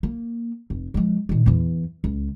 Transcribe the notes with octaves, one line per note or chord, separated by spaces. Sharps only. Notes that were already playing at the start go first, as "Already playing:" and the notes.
A#3
F1
F3 G#3
A#2 D#3
E2 E3
C#2